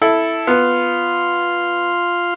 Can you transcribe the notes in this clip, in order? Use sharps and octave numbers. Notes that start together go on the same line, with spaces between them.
E4 A4
B3 F4 B4 C6 F6